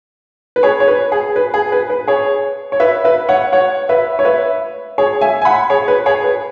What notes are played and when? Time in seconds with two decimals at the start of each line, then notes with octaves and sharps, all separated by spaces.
0.56 B4
0.63 G#4 C#5
0.80 C#5
0.88 B4
1.12 G#4
1.36 B4
1.54 G#4
1.72 B4
1.90 B4
2.07 G#4 C#5
2.72 C#5
2.80 B4 E5
3.04 B4 E5
3.29 C#5 F#5
3.52 C#5 F#5
3.89 B4 E5
4.19 C#5
4.25 B4 E5
4.98 G#4 C#5
5.21 E5 G#5
5.42 G#5
5.45 F#5 B5
5.70 G#4 C#5
5.88 B4
6.06 G#4 C#5
6.24 B4